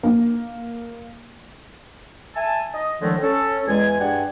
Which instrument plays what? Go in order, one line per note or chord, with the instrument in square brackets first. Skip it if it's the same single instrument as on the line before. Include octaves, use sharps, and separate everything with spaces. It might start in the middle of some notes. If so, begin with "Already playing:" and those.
[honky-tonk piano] A#3
[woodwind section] E5 G#5 A5
D#5
A2 D3 D#3 F3 G#3 A3
C#4 A4
E2 G#3 G#5
G2 G4 G#4 D5 F#5 G#5